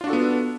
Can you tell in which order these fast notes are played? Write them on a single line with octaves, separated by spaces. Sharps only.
F4 D4 F#4 A4 B3